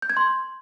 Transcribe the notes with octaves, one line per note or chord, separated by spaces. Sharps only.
G6
G#6
C6